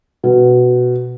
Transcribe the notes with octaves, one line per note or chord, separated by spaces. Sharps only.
B2